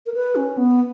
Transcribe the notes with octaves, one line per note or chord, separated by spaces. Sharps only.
A#4
B4
C#4
B3